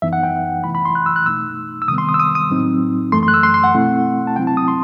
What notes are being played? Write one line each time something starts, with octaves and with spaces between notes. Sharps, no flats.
F#2 E3 B3 D#4 E5
F#5
G5
C3 E3 A3 E4 B5
B5
C6
F#6
E6
F#6
B2 A3 D#4 E6
E6
C3 D#3 G3 B3 D#6
C6
D#6
E6
D#6
D#6
A2 F#3 C4 D#4
F#2 E3 A3 C6
C6
F#6
E6
C6
C6
F#5
B2 A3 C4 E4
A5
C3 F#3 C4 E4 G5
A5
D#6
C6